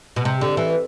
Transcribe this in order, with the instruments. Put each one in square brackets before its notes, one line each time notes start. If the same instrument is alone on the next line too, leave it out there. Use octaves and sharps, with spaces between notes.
[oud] B2
C3
D3
E3